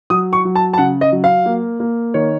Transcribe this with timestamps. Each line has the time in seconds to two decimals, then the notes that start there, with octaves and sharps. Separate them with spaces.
0.10 F#3 D#6
0.33 C#6
0.45 F#3
0.55 A5
0.73 A5
0.78 C#3 F#5
1.01 D#5
1.12 F#3
1.24 F5
1.46 A#3
1.80 A#3
2.14 D#3 C#5